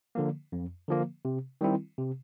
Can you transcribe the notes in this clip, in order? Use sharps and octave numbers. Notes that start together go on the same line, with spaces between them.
D3 F3 A#3
F2
D3 F3 A#3
C3
D#3 G3 C4 E4
C3